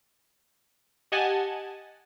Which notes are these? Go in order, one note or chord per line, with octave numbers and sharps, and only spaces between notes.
G4 D#5 F#5 G#5 A5